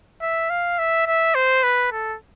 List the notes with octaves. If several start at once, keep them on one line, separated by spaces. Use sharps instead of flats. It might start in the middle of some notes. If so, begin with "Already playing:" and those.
E5
F5
E5
E5
C5
B4
A4